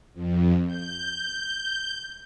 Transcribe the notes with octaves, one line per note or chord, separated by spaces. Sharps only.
F2
G6